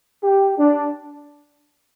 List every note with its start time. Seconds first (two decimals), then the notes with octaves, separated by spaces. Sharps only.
0.24 G4
0.58 D4